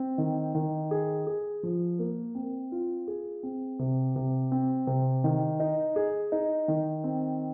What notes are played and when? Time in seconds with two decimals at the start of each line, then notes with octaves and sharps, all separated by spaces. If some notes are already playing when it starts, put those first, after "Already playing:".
Already playing: C4
0.18 D#3
0.55 D#3
0.91 G#4
1.27 G#4
1.63 F3
1.99 A#3
2.35 C4
2.72 F4
3.07 G#4
3.43 C4
3.79 C3
4.16 C3
4.52 C4
4.87 C3
5.24 D#3
5.60 D#4
5.96 G#4
6.32 D#4
6.68 D#3
7.04 C4